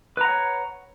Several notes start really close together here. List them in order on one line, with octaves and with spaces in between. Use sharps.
B4 A#5 F#5 C#5